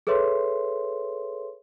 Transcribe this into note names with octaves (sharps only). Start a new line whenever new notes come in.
G#4 A4 B4 C#5 E5 C6